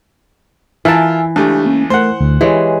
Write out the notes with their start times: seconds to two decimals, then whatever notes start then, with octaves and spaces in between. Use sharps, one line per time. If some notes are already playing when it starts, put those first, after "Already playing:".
0.85 E3 F4 A#4 G#5 A5 E6
1.36 C#2 A3 D4 G4
1.65 A#3 C#4
1.90 A3 A#4 C5 F#5
2.21 D2 D3 A3
2.41 E3 G#3 G4 B4 C#5